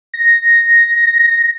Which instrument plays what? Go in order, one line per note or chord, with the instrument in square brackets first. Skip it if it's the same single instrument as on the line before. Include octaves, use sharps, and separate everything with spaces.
[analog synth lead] A#6